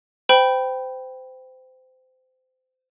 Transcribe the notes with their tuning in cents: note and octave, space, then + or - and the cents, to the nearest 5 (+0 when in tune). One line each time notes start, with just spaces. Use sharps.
C5 -25 G5 +0 B5 +0